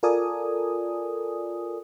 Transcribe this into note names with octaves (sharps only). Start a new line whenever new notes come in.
F4 A4 A#4 D5 G#5 D#6